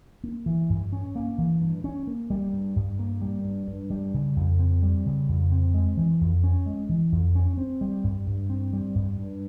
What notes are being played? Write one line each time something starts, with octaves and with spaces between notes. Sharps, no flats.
A#3
E3
G2
C#4
A#3
E3
G2
C#4
A#3
G3
G2
G2
A#3
G3
G2
G2
G3
C#3
F2
C4
G3
C#3
F2
C4
G#3
E3
F2
C#4
G#3
E3
F2
C#4
C4
G3
G2
G2
C4
G3
G2
G2